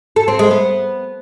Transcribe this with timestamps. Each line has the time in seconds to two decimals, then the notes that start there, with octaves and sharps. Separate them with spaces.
0.16 A4
0.28 C4
0.39 G#3
0.51 B3